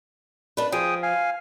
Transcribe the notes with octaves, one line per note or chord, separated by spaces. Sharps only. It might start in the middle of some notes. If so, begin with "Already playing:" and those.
D4 B4
F3 G#4 G5 D#6
F5 G#5